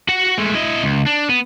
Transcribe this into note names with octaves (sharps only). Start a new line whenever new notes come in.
F#4 F#5
G#3 A3
E4 D#5
C#2
D4
B3